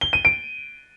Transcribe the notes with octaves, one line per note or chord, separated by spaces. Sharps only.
G7
D#7
D7